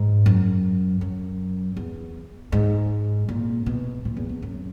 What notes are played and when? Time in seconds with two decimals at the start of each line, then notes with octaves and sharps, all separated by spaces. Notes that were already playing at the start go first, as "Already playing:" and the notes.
Already playing: G#2
0.26 F#2
1.01 F#2
1.76 E2
2.52 G#2
3.29 A#2
3.66 B2
4.05 A#2
4.17 E2
4.29 E2
4.42 F#2